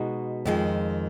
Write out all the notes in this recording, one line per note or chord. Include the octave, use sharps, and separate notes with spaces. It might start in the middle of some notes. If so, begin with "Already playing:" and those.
Already playing: B2 G#3 D#4 F#4
F2 D#3 G#3